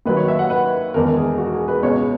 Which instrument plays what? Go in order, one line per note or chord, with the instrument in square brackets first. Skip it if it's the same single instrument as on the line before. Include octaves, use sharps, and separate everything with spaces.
[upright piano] D#2 D#3 F#3 B4
C#5
E5
F#5
B4
E1 E2 D#3 A#4
G#4
F#4
G#4
B4
C#2 B2 G#3 C#5